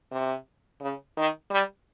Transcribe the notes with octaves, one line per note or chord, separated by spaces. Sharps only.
C3
C#3
D#3
G3